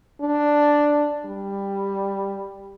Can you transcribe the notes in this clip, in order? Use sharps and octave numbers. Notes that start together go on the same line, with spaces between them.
D4
G3